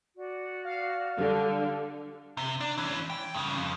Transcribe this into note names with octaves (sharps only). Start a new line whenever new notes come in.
F#4 D5
F5
D3 G3
C3
D4
E3 C#4
G5
G2 C#3
F2